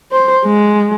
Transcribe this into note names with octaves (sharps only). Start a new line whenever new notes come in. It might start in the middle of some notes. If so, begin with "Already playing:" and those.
C5
G#3